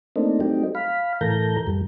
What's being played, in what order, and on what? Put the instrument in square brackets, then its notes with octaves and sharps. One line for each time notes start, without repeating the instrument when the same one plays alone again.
[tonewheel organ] A3 A#3 C4 D4 D#4
F#3 A3 C4 D#4 G4
F5 B5
A2 E3 A4 A#4 A#5 G6
F#2 G3